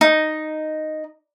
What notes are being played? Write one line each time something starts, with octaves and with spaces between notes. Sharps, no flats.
D#4